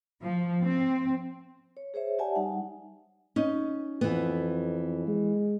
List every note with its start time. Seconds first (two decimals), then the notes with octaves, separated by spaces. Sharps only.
0.22 F3
0.64 C4
1.77 C#5
1.94 G#4 C5 C#5 E5
2.19 G4 D5 E5 F#5 G#5 A5
2.35 G3 D#4 F#5
3.36 C#4 D#4
4.01 F2 E3 B3
5.07 G#3